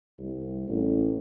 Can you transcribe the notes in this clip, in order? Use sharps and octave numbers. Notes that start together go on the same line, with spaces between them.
C2
A1